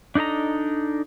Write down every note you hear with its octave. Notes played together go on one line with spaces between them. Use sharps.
D4 D#4 A4 D#5 A#5